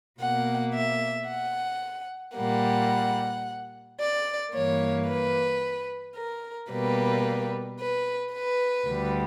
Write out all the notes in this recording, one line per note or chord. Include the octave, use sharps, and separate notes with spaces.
B2 A#3 F#5
E5
F#5
A#2 G3 A#3 F#5
D5
G2 E3 A#3 C#5
B4
A#4
B2 G3 A#3 B4
B4
B4
D2 D3 G3